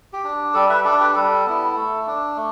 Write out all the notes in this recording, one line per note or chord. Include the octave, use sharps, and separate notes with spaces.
G4
D4
G3 A4 D5
B4 E5
D4 A4 D5
G4 B4
G3 A4
B3 E4
A3
D4
A3